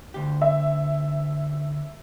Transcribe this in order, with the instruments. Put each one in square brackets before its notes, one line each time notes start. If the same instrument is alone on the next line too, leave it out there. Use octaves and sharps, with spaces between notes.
[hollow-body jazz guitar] D2 G4
[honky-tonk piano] E5